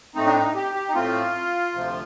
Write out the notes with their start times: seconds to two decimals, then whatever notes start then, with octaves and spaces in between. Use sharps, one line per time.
0.15 A2 A3 C4 D#4
0.26 D4
0.35 D#4
0.55 G4
0.75 G4
0.89 D#4
0.95 A2 A3 C4 F4
1.74 D2 C3 F3